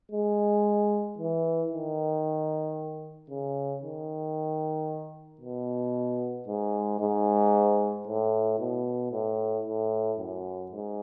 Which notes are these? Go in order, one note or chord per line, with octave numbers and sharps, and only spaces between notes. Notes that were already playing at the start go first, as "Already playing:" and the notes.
G#3
E3
D#3
C#3
D#3
B2
G#2
G#2
A2
B2
A2
A2
F#2
G#2